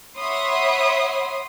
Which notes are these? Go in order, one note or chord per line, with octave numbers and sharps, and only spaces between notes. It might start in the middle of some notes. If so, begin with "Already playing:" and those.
C#5 E5 F#5 B5 C6 D#6